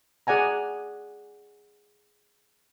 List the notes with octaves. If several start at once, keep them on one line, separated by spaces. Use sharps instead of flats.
G#4 D5 F#5 G#5 A#5